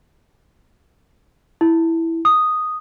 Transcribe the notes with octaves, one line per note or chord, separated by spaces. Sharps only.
E4
D#6